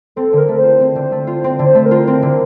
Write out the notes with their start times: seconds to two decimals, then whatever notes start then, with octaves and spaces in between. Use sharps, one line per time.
0.16 C4 A4
0.33 D3 A#4
0.49 A3
0.59 C5
0.64 F4
0.81 C4
0.96 D3
1.12 A3
1.27 F4
1.44 C4
1.59 D3
1.65 C5
1.75 A3
1.86 A#4
1.91 F4
2.07 C4
2.22 D3